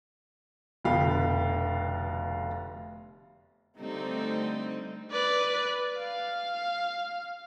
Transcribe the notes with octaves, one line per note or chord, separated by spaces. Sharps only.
F1 B2 D3 F5 G5 B5
D3 G3 A3 C4 D#4
B4 D5
F5